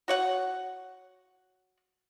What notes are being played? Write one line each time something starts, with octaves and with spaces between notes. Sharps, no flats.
F#4 C#5 F#5